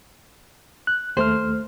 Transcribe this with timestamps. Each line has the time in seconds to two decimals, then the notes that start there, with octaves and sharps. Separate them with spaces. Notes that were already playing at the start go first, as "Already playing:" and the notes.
0.87 F#6
1.17 D#2 A3 C5 F6